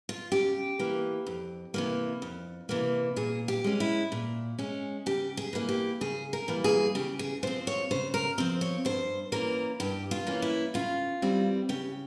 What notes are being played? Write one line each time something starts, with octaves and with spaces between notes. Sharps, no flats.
F4
C#3 G4
E3 A#3
F2
C3 E3 A#3
F2
C3 E3 A#3
A#2 G#4
G4
G#3 C#4
E4
A#2
G#3 C#4
C#3 G4
G#4
E3 G3 A#3
G4
C#3 G#4
A#4
E3 G3 A#3
G#4
C#3 G4
G#4
F3 C4 C5
C#5
C#3 C5
A#4
F3 C4 C5
C#5
G2 C5
E3 A#3 C#4 A#4
G2 G4
F4
E3 A#3 C#4
E4
C#3 F4
E3 G3 C4
C#3 G4